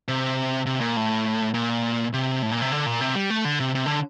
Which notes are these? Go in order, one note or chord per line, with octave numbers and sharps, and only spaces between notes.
C3
C3
A#2
A2
A#2
C3
A2
A#2
C3
D3
A#2
C3
G3
A3
D3
C3
C3
D3